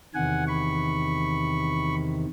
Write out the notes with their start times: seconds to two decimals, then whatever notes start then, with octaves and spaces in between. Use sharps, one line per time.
0.14 E2 C3 D#3 F#5 G#5
0.47 B5 C#6